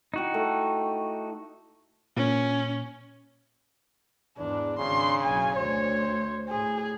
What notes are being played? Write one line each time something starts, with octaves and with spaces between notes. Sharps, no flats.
D#4 E4 F#4 G4
A3
A#2 C#4
E2 G#2 D4
G#1 C#3 D4 C6
F#1 B1 G#5
D2 C5 C#5
A2 G#4